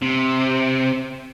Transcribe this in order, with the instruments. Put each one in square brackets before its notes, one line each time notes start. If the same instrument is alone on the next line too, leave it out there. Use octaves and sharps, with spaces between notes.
[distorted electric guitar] C3